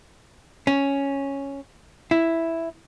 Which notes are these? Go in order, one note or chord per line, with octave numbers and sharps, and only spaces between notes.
C#4
E4